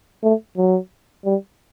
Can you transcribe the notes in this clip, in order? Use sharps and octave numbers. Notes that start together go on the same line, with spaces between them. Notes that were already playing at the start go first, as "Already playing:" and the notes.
A3
F#3
G3